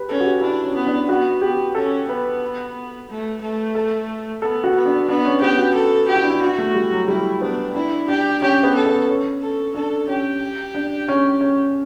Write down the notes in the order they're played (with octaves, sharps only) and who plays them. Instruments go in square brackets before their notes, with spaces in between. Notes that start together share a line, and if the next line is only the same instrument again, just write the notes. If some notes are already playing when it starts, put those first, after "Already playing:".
Already playing: [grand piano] G4 B4
[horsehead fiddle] C#4 [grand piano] A4
[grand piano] F#4
G4
[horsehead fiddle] D4 [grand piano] E4
[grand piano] C#4
[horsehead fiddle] B3
[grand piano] D4
[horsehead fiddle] B3 [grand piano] F#4
[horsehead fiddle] B3 [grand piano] G4
[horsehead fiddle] C#4 [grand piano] A4
[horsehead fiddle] B3 [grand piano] B4
[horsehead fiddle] A3
A3
[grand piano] A4
[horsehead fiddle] B3 [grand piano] A4
[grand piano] F#4
[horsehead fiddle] B3
[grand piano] D4
[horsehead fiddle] B3 [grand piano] D4
[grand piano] C#4
[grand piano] B3 [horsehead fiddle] G4
[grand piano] F#4
[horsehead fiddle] A4
[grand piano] F#4 [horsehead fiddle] G4
[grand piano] E4
D4
E4
[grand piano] E4 [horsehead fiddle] F#4
[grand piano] A3
G3
F#3
[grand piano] G3 [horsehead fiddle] E4
[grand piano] B3 [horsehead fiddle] D4
[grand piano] D4 [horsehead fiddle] E4
[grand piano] D4 [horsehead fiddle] G4
[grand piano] C#4 [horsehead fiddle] G4
[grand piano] B3
[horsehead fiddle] A4
[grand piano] B3
C#4
[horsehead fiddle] A4
[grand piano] D4 [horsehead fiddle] A4
[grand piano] C#4 [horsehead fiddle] G4
[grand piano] D4
C#4
C#4